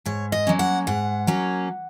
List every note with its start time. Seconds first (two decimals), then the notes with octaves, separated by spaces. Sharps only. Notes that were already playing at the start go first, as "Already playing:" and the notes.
0.06 G#2 C#5
0.32 D#5
0.47 F#3 A#3 C#4
0.59 F#5
0.87 G#2 F#5
1.27 F#3 A#3 C#4